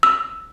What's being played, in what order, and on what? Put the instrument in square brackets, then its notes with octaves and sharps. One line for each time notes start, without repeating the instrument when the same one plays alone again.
[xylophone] E6